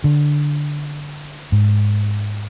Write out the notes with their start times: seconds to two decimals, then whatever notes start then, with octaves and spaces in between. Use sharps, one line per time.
0.04 D3
1.52 G#2